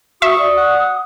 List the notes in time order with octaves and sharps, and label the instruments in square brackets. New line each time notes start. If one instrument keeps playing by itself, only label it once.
[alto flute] F#4 [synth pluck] E5 [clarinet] C#6 [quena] D#6
[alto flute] D5
[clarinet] F#5